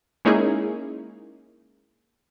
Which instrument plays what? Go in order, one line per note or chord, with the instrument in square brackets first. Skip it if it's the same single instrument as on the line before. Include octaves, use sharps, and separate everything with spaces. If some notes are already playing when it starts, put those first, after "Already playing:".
[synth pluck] G#3 A#3 C#4 D#4 E4 G#4